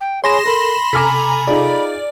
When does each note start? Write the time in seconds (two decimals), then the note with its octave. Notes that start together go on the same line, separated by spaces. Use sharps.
0.01 G5
0.24 G#4 C#5 G#5 B5 C6 A#6 E7
0.46 A4 A#4 B5
0.93 C3 A4 G#5 A#5 D6 F6 B6
1.47 D#4 F4 G#4 D5